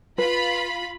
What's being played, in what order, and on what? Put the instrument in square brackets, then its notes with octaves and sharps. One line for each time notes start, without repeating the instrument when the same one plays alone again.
[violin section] F4 B5 [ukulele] B4